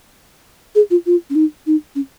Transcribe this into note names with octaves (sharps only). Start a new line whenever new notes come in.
G#4
F4
F4
C#4
D#4
D#4
C#4